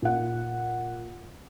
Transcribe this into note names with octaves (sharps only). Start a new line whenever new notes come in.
A#2 F#5